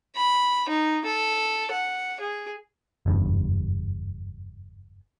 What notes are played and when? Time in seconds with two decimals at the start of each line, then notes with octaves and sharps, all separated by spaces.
0.16 B5
0.69 D#4
1.05 A4
1.72 F#5
2.20 G#4
3.06 F#1 E2 G2